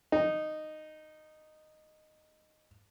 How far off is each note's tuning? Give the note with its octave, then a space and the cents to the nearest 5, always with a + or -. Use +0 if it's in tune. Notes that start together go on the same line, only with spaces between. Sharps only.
D#4 -10